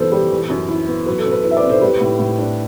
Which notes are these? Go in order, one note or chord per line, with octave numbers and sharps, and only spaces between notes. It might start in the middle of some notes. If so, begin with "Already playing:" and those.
Already playing: F#2 E3 B3 A4 C5
G3
E3
F#2
E4
B3
F#3 B4
A4
F#2
B4
E4 B4
E5
B4 D5
C4
A4 C5
G3 B4
A2
A2
D4